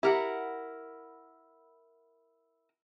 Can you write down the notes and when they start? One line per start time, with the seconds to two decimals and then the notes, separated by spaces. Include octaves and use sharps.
0.03 E4 G4 A#4 E5 F#5